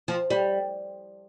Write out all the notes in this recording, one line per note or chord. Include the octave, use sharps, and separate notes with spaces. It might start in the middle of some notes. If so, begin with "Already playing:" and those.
F3
G3